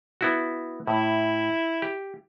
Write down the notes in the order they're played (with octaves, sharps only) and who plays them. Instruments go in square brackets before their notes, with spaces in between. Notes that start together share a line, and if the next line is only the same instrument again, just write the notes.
[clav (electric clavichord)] B3 E4 F#4
[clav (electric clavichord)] A2 [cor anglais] E4
[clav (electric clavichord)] G4